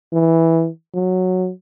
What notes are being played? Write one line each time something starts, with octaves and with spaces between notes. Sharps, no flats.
E3
F#3